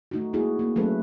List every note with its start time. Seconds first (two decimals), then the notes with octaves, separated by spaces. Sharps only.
0.11 A3 D#4 F#4
0.33 G3 A#3 B3 E4 F#4 G#4
0.59 A#3 C4
0.76 F#3 A3 C#4 G#4 A4 B4